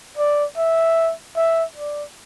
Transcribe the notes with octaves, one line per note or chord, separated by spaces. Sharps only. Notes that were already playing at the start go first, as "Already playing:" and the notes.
D5
E5
E5
D5